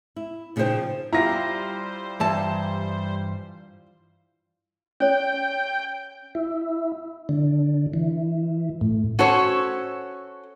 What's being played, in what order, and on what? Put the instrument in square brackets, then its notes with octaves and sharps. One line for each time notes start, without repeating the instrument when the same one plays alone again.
[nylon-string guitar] E4
A#2 C#3 F3 D#4 C5 G5
[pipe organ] G3 C5 [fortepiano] E4 F4 G4 [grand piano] A#5 A#6
[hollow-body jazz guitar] G2 E3 A5
[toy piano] C#4 C#5 [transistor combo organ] G5
[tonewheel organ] E4
D3
E3
A2
[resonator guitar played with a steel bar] C#4 F#4 A4 C5 C#5